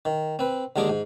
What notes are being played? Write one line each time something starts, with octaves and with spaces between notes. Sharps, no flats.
D#3
C4 B4
D#2 D3 G#3 G#4 D6
G#2